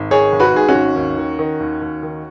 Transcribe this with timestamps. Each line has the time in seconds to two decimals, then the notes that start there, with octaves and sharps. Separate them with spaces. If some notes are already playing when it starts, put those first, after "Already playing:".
Already playing: G#1
0.11 D#3 G#4 C#5
0.32 G#1
0.40 F#4 B4
0.54 G#2 G#4
0.69 C#4 F#4
0.75 G#1
0.96 D#2
1.18 D#3
1.39 D#3
1.60 D#2
1.81 D#2
2.03 D#3